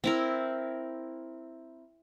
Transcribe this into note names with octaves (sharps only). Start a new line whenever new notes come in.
C4 E4 A#4